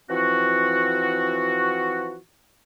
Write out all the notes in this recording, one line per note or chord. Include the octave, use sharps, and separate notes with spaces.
E3 F3 C4 F#4